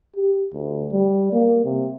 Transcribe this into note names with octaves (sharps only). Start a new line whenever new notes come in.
G4
D2
G3
A#3
C3